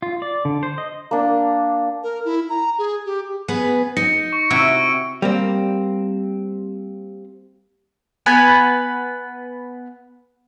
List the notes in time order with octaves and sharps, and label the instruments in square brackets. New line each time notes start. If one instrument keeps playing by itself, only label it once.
[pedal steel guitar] F4
D5
D3
C5
D#5
[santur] A#3 D4
[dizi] A#4
E4
A#5
G#4
G4
[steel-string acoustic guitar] B3 G#4 B4 [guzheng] F#5
[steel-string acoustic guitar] D#4 [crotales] A#6 C#7
[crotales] C#6
[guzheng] C3 E4 F#4 [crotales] E6 D7
[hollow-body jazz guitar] G3 A#3 C4
[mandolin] B3 B4 G#5 B5